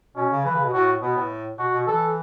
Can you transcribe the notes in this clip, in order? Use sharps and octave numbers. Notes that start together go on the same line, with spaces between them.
B2 C#4
C#3
E3 B4
C#3
B2
A2 F#4
B2 B3
A2
B2 F#4
B2
E3 A4